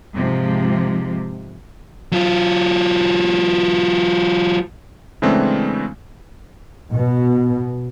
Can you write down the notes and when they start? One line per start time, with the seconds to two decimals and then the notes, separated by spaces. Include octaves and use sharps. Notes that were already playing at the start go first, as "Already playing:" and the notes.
0.14 G#2 C3 F3
2.12 F#3 F4
5.22 C#3 E3 G#3 A3 C4 D4
6.94 B2